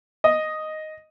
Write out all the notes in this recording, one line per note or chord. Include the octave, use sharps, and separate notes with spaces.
D#5